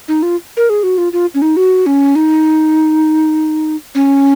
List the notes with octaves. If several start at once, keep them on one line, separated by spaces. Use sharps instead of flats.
D#4
F4
A#4
G#4
F#4
F4
F4
C#4
D#4
F#4
C#4
D#4
C#4